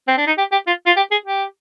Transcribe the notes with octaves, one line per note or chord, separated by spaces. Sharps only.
C4
D4
D#4
G4
G4
F4
F4
G4
G#4
G4